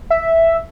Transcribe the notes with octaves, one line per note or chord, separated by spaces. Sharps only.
E5